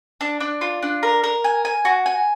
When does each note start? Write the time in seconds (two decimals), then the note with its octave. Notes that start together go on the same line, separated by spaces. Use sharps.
0.21 D4
0.40 D4
0.61 F4
0.82 D4
1.03 A#4
1.24 A#4
1.44 G#5
1.65 G#5
1.85 F#4
2.06 G#5